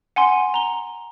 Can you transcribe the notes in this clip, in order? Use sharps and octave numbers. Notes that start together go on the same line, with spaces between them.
F#5 G#5 C6
A#5 G7